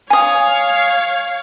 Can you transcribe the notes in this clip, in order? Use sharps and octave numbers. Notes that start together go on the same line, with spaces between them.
C#5 F5 G#5 D#6